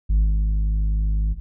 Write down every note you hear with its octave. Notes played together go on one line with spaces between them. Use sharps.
G#1